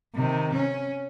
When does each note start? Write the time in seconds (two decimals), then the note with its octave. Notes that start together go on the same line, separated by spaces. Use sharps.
0.14 C3 D#3
0.53 C#4